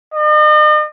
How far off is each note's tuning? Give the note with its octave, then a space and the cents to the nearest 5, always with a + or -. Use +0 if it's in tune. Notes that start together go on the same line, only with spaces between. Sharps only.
D#5 -45